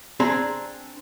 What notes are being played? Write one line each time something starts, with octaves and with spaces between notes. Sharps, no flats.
C4 D4 G#4 A#5